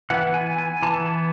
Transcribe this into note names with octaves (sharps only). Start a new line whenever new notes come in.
E3 B3 F#5
G#5
G#5
E3 B3 A5